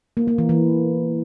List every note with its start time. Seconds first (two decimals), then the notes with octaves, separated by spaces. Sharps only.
0.17 A#3
0.28 A#3
0.38 E3
0.49 E3